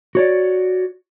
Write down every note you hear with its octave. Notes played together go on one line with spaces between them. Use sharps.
F#4 C#5 D5